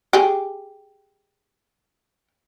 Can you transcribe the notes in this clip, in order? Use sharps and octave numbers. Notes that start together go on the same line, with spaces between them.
G4 G#4